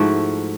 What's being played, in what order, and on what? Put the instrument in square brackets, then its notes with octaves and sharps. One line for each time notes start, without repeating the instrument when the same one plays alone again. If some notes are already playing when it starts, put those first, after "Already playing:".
Already playing: [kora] G#2 F3 A3 E4 F#4